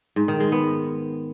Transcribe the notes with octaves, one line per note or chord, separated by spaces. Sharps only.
G#2
D#3
G#3
B3